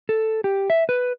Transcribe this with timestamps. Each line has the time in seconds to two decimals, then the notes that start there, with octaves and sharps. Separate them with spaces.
0.09 A4
0.44 G4
0.70 E5
0.89 B4